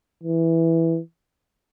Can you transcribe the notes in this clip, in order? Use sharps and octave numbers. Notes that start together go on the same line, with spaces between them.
E3